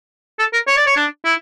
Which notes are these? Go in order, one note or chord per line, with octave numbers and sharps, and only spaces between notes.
A4
A#4
C#5
D5
C#5
D4
E4